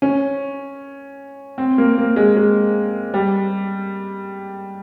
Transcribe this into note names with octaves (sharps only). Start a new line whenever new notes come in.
C#4
C4
A#3
A#3
G#3
G#3
G3